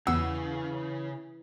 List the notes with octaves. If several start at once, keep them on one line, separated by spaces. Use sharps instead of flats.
E2 C#3 E3 F#5 E6